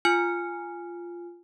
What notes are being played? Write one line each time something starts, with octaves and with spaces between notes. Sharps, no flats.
F4 G#5 F6 C#7